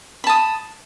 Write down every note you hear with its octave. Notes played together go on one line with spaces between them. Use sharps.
A5 B5 D#6